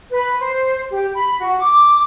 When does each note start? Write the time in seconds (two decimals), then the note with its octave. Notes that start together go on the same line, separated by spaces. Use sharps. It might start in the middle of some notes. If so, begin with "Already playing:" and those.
0.11 B4
0.39 C5
0.91 G4
1.15 B5
1.39 F#4
1.59 D6